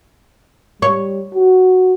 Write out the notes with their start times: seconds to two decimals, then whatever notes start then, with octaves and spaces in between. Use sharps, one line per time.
0.82 G3 C#5
1.35 F#4